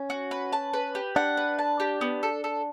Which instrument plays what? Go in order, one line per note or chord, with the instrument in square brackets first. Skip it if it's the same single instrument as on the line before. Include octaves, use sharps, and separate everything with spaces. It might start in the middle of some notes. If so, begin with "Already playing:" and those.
Already playing: [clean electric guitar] C#4
[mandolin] F#4
B4
A5
B4
G4
[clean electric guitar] D4 [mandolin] F#5
[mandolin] B4
A5
G4
B3
A4
A4